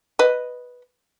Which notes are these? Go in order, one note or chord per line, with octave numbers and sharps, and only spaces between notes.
B4 D#5